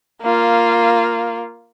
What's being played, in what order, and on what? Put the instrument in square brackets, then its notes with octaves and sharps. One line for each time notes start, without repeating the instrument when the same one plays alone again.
[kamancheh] A#3 F4